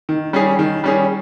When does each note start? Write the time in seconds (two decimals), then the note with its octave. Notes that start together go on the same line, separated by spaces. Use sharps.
0.09 D#3
0.33 G3 C#4 G#4
0.59 D#3
0.84 G3 C#4 G#4